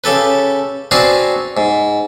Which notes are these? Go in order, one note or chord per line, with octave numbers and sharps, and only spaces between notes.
C#3 G4 A4 B4
C4 D4 F#4 G#4 B4 F5
G#2